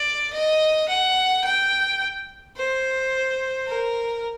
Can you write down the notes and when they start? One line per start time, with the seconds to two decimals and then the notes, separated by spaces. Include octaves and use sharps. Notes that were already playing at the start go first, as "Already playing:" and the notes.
Already playing: D5
0.33 D#5
0.89 F#5
1.44 G5
2.57 C5
3.67 A#4